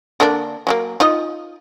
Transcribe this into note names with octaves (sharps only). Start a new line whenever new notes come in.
D3 A#3 D4
F#3 G#3 A#3
D#4 F4 D#5